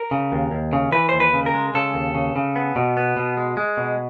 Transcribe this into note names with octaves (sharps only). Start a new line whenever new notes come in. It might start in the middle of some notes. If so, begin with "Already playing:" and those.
Already playing: A#4
C#3
D#2
D#2
C#3
E3 B4
D#2 C5
B4
C#3
A#4
G#3
C#3 A4
D#2
C#3
C#3
B3
B2
B3
B2
G#3
G#3
B2